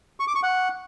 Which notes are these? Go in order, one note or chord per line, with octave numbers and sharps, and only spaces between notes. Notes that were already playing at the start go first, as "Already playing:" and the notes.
C#6
D6
C#6
F#5